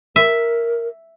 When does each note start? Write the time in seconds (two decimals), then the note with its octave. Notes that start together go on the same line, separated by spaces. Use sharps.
0.16 A#4 E5